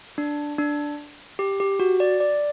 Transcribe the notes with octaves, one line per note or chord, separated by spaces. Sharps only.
D4
D4
G4
G4
F#4
D5
D5